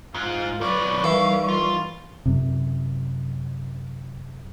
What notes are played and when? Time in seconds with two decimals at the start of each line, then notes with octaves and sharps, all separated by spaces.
0.15 G#2 F4
0.61 F#2 F#3 B4 D5 C#6
1.04 D#3 E3 G3 F5
1.49 F4
2.26 F#2 C3